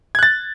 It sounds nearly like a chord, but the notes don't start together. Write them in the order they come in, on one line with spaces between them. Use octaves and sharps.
G#6 F#6 A6